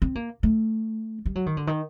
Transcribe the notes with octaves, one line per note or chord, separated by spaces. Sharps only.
C4
A#3
A3
G3
F#3
D#3
D3
D#3